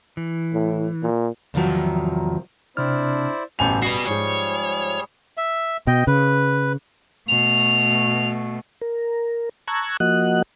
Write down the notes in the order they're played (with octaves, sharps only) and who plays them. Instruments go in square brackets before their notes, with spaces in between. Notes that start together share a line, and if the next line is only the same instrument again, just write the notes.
[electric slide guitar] E3
[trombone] A2
A#2
[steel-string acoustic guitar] E2 G#2 C3 D#3 F3 F#3
[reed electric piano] C3 F6 [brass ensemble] C4 D4 [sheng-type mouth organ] E4 C5 D5
[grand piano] A1 G#5 F7 [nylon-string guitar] G2 B2 [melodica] G4 A4 C5
[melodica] G3 G#4 [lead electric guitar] F#4 B4 [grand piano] C7
[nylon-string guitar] G#2 F3 G#3 [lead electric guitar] C#5
[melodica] E5
[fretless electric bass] B2 [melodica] D#5 G5
[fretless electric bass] C#3 [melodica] B4
[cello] B2 A3 [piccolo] F7
[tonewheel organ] A#4
A5 A#5 C#6 E6 F#6 G#6
F3 A#3 F#4 D#5 F#5 F#6